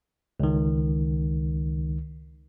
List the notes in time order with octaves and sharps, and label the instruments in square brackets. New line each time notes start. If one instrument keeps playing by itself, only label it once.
[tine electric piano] C#2 D#3